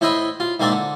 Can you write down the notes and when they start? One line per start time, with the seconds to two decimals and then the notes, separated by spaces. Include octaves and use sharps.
0.01 A2 E4 C5 D#5 E5 B5
0.40 F4
0.60 G#2 A#3 C4 A#4 D5 E5
0.72 D3